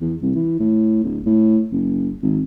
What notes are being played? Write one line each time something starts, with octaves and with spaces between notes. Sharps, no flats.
E2
C2
E3
A2
D1
A2
F#1
G#1